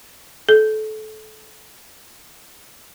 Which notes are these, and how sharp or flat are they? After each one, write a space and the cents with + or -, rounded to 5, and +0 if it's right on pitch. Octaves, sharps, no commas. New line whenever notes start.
A4 -25